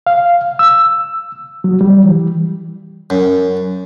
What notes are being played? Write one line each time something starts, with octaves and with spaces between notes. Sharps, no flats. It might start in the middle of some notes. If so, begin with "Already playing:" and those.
F5
E6
F#3
G3
E3
F#2